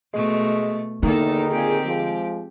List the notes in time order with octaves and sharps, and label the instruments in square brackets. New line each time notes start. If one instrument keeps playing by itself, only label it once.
[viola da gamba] B2 A3 [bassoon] G#3
[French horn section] E2 D#4 [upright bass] D3 [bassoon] D#3 [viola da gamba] A#3 A4
[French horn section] A#2 G#4 [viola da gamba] C4 G4
[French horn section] F3 G#3